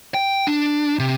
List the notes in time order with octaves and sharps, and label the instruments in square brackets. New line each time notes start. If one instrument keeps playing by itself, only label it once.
[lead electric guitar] G5
D4
C3